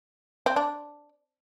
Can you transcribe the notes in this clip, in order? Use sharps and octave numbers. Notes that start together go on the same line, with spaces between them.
C4
D4